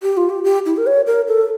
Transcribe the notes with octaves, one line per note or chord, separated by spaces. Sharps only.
G4
F4
G4
G4
E4
A#4
C#5
A#4
A4